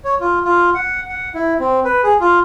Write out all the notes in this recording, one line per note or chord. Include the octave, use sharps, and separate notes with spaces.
C#5
F4
F4
F#5
F#5
E4
C4
B4
G#4
F4